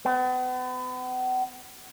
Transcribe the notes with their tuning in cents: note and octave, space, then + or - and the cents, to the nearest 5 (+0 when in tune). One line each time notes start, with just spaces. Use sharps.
B3 +40